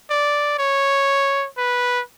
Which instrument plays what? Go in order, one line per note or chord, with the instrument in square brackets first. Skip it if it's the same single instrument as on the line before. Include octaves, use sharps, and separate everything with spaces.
[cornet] D5
C#5
B4